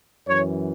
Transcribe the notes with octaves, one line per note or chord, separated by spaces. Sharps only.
F#2 E3 C#5